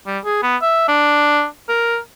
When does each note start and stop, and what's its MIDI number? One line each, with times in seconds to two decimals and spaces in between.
0.06 0.18 55
0.25 0.40 68
0.43 0.56 59
0.62 0.84 76
0.88 1.45 62
1.69 1.97 70